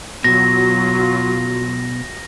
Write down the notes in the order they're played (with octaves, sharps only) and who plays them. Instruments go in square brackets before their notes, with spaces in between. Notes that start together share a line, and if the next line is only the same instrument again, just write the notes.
[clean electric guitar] B2 [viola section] F#3 F4 [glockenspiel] A#6